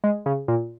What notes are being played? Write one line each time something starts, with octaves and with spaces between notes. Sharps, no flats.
G#3
C#3
A#2